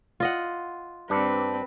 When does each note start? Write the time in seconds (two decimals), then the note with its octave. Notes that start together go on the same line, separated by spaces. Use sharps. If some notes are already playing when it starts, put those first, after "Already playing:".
0.20 F4 D#5 F#5
1.10 G2 C4 D4 B4